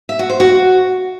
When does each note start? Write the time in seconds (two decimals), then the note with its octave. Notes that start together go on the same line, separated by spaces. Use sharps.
0.09 E5
0.19 F#4
0.30 C5
0.40 F#4